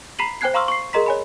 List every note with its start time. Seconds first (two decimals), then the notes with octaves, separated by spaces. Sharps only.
0.19 A#5 B5 B6 C7 D#7 F#7
0.41 C5 G5 G#5 F#6 G#6 C7
0.54 F5 A#5 C6 C#6 E6 F6
0.68 C#6 C7
0.93 G#4 A#4 D#5 A#5 C6 B6
1.06 C#5 G#5 B5